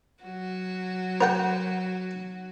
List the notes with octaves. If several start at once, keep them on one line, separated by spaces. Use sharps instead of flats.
F#3 F#4
A#4 F#5 G5